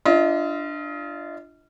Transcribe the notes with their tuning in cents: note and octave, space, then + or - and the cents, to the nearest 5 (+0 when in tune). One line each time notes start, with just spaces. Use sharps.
D4 +10 F4 -25 D#5 +35